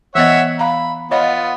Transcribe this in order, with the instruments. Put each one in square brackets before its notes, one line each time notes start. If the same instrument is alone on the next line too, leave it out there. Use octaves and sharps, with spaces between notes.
[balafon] E3 B3 D#5 [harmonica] C#5 E5 F#5
[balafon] F5 A#5 [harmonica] B5
[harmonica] B3 F4 [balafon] C#5 D#5 F#5